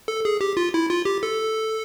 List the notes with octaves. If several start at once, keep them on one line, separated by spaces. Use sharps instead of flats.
A4
G#4
G4
F4
E4
F4
G4
A4